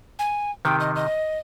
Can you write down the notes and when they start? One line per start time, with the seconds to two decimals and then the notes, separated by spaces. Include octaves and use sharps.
0.19 G#5
0.65 C3 D#3 G5
0.80 D#5
0.96 D#5